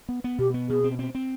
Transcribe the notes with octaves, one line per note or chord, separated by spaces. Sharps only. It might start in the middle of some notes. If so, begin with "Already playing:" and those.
B3
B3
B2 G4
B3
B2 G#4
C4
C4
C4